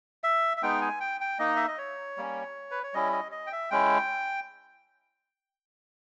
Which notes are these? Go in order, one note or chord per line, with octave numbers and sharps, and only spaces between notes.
E5
E5
G#3 B3 D#4 G5
G#5
G5
G5
A#3 D#4 D#5
E5
D#5
C#5
G3 A#3 C#4
B4
C#5
G3 C#4 E4 D#5
D#5
D#5
G5
E5
G#3 C#4 E4 G5